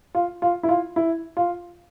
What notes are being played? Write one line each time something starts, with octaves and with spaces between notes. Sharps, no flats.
F4
F4
E4
F4
E4
F4